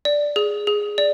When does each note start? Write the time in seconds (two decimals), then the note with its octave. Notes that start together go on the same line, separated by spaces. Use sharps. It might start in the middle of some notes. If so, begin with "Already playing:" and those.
0.05 D5
0.36 G#4
0.67 G#4
0.98 D5